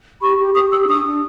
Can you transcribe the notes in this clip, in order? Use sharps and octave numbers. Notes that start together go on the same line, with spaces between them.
G4 B5 C#6
G4
G4 C#6 D#6
G4 D6 E6
D4 C#6 D#6
D4